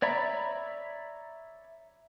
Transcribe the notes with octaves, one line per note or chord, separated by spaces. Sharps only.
C#5 D5 E5 A#5 B5